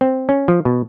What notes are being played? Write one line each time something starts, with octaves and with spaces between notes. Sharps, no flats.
C4
C#4
F3
B2